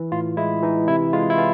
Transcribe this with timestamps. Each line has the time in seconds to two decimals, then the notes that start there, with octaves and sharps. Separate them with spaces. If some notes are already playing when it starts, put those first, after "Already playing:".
Already playing: E3
0.12 A2 F4
0.37 G#3 E4
0.62 E3 D#4
0.88 C3 E4
1.13 G#3 F4
1.30 E4
1.38 E3 F4